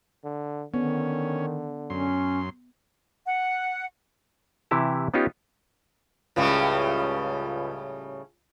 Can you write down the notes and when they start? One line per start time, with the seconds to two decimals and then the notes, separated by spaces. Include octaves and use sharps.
0.24 D3
0.74 D3 D#3 B3 C#4
1.90 F#2 C#4 C6
3.27 F#5
4.71 C3 E3 E4 G4 A5
5.14 B3 C#4 D#4 F4 G4
6.36 C#2 A2 C#3 G3